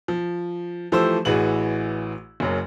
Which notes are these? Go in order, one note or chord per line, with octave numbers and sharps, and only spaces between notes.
F3
E3 F3 A3 G4 C5 E6
A1 E3 F#4 G#4 B4 F#7
F#1 F#2 F#3